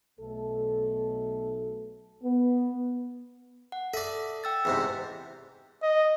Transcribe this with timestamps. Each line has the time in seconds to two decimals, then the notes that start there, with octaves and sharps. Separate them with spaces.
0.20 B1 B2 A3 A4
2.24 B3
3.72 F#5
3.94 A4 D5 E5
4.44 G5 E6 A6
4.65 E2 G#2 C3
5.83 D#5